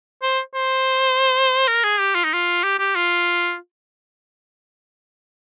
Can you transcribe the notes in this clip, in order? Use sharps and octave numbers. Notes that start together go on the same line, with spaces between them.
C5
C5
A#4
G#4
G4
F4
D#4
F4
G4
G4
F4